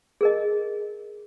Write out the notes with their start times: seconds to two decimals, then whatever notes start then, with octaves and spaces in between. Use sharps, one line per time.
0.21 G#4 A#4 D#5